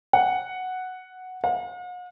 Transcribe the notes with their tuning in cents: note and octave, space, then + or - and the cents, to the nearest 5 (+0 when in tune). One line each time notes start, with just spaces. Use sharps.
F#5 +0
F#5 -45